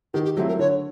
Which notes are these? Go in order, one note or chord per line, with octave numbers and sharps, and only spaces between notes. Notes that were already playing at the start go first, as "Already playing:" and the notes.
D#3 G4
G4
F#3 A3 C4 E4 G4
A#4
D3 C#5